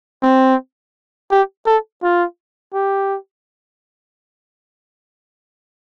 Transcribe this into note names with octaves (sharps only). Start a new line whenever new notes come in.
C4
G4
A4
F4
G4